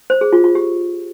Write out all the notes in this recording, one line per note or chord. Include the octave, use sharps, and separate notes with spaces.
C5
G#4
F4
F4
G4